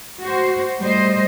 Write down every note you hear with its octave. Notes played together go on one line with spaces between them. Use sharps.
F#4 C5
G3 A3 C5 D#5